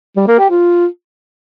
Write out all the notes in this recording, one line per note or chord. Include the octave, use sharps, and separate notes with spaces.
G3
A#3
G4
F4